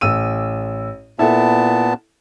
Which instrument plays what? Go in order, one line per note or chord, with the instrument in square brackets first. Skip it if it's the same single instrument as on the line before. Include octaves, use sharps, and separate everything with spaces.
[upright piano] A1 E6 D#7
[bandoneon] A#2 B3 A5 [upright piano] E4 A4